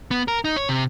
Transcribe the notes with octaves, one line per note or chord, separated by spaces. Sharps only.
B3
A#4
D#4
C#5
C3